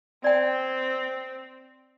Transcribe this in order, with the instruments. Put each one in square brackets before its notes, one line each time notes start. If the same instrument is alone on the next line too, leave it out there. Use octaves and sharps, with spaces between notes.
[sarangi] C4 [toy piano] D5 G5